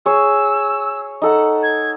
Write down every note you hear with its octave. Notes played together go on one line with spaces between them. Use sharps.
G#4 C#5 E6
D#4 A4 F#5
G#6